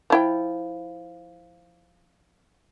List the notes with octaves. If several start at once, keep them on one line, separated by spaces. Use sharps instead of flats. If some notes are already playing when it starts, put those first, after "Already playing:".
F3 E4 G5